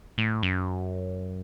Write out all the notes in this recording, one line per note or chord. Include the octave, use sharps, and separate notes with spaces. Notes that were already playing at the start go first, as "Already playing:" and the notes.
A2
F#2